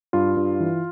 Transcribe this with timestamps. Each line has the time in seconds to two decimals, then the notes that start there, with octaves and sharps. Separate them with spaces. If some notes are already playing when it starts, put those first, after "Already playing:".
0.13 G2 F4 F5
0.37 G2
0.60 E3